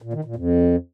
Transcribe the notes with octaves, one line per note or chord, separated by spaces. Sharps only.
A#2
D#3
A#2
F2